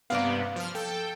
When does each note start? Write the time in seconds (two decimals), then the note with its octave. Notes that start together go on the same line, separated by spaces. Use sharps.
0.10 G2 C3 A#3 B3 D5 F5
0.56 F3 F6
0.75 A4 G5